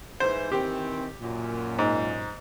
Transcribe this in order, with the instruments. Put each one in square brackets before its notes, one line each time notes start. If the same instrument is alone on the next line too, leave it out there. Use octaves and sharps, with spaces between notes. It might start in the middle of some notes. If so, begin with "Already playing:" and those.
[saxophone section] G#2 E3 [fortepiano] C5
[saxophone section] D#3 E3 C4 [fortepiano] G4
[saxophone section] F#2 A#2
[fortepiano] G#2